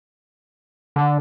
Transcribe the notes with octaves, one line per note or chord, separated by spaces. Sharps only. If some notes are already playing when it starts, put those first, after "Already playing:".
D3